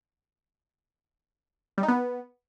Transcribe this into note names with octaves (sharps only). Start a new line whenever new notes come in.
G3
D#4
B3